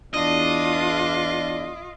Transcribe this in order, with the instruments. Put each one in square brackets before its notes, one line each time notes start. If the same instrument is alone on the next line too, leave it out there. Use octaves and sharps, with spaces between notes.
[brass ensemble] E2 D4 [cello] F4 [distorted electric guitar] D#5